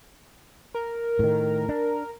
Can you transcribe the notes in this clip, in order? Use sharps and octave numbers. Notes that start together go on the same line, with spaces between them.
A#4
A2 D#3
D4